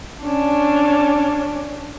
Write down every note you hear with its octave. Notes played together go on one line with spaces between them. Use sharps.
C#4 D4